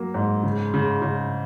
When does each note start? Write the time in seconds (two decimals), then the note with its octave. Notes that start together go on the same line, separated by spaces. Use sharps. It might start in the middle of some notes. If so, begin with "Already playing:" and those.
Already playing: F#3 A#3
0.14 G#2
0.43 C#3
0.74 C#3
1.02 C#3